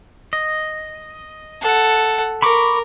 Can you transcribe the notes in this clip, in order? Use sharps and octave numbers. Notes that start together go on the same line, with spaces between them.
D#5
A4 F#5
A#4 B5 C#6 D6